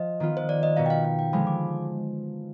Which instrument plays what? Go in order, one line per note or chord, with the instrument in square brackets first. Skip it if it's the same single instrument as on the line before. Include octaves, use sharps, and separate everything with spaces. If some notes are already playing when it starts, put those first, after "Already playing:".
Already playing: [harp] F3 [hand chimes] D#5
[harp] D#3 B3 F4
[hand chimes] C5
D5
D#5
[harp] B2 B3 D#4 [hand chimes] F5
[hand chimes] G5
F5
F5
G5
[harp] D3 F3 G#3 [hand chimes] B5
[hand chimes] D6